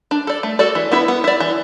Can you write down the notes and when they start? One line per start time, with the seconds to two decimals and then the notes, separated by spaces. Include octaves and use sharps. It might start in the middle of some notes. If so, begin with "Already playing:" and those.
0.11 D4
0.27 A4 D5
0.43 A3
0.59 F#4 A4 D5
0.75 E3
0.92 B3 E4 B4
1.08 B3
1.24 E4 D5
1.40 E3